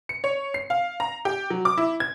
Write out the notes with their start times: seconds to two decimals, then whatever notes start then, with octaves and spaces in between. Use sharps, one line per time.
0.09 C#7
0.24 C#5
0.54 C7
0.70 F5
1.00 A#5
1.25 G4
1.50 F#3
1.65 D6
1.78 E4
2.00 G#6